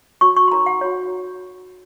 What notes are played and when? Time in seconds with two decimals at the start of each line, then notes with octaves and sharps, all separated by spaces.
0.21 F#4 C#5 C#6
0.36 C#6
0.48 C6
0.52 D#4 A#4 C#5 A#5
0.66 F#5
0.81 F#4 C#5